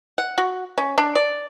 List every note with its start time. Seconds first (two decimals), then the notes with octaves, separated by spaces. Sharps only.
0.18 F#5
0.38 F#4
0.78 C#4
0.98 D4
1.15 D5